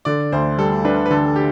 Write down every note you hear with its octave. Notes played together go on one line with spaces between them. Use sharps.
D3 D5
D2 C5
G3 A4
D4 B4
B4
D3 A4
G4